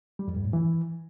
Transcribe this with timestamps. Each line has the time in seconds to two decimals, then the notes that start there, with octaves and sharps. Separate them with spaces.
0.19 G3
0.28 F2
0.36 G2
0.45 A2
0.53 E3